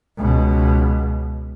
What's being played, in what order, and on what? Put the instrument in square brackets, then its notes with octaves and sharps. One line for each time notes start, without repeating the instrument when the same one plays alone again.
[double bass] C#2 B2